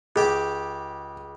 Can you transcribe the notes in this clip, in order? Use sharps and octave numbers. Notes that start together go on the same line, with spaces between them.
C#2 G4 G#4 D6